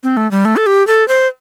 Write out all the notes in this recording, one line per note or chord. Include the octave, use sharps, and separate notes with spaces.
C4
A3
G3
A3
A4
G4
A4
C5